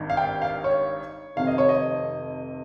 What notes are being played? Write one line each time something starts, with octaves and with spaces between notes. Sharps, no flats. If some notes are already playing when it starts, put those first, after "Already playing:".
Already playing: G#1 G2 D#3
F5
G5
F5
C#5
F1 F2 C3 D#3 F5
D#5
C#5
D#5